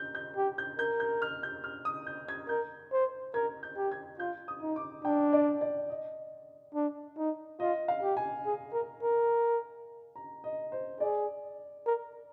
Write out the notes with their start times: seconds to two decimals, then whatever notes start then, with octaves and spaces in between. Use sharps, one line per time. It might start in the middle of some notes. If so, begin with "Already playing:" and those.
Already playing: G6
0.15 G6
0.36 G4
0.58 G6
0.78 A#4 G6
1.00 G6
1.22 F6
1.43 G6
1.64 F6
1.85 D#6
2.07 G6
2.28 G#6
2.49 A#4 G6
2.92 C5
3.34 A#4 G#6
3.63 G6
3.77 G4
3.92 G#6
4.19 F4 G6
4.48 D#6
4.62 D#4
4.76 D6
5.05 D4 G5
5.33 D5
5.61 D5
5.90 D#5
6.74 D4
7.18 D#4
7.60 F4 D#5
7.88 F5
8.02 G4
8.17 G#5
8.46 G#4
8.73 A#4
9.02 A#4
10.16 A#5
10.44 D#5
10.72 C5
11.00 G#4 D5
11.86 A#4